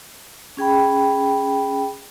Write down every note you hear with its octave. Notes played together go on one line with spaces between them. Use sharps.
C#4 G#4 G5 B5